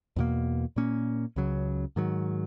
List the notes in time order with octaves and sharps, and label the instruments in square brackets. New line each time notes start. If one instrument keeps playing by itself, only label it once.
[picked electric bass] E2 B2 A#3
A#2 A#3 C#4
C#2 C#3 F#3
G#2 D#3 F#3